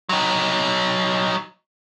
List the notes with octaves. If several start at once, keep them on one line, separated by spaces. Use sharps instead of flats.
F#3 D#4